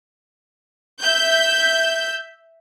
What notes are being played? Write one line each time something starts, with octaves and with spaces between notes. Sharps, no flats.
E5 G6